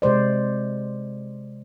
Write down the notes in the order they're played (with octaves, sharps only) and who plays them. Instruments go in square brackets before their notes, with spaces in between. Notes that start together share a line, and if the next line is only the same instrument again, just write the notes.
[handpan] C3 G#3 C5 D5